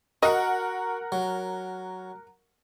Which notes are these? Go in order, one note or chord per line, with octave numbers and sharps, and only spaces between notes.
F#4 A#4 D#5 F#5
F#3